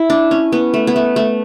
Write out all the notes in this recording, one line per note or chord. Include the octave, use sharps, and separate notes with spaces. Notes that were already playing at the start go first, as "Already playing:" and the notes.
Already playing: E4
D4
C#4
B3
A3
B3
A3
A3